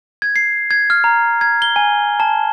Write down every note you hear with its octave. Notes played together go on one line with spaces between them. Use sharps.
G#6
C7
G#6
F6
A#5
G#6
G7
G#5
A5